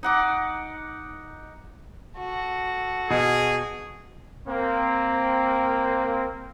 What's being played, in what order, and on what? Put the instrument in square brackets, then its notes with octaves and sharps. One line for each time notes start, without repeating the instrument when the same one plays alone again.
[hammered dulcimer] D#4 F#5 D6
[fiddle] F#4 A4
[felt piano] B2 [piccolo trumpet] G#4
[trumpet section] A#3 C4